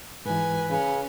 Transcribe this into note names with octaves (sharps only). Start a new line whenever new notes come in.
G#2 E3 B4 G#5
C#3 C#4 G#5